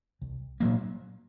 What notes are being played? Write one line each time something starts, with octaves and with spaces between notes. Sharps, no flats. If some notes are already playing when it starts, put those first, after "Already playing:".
C2
A#2 F#3 A#3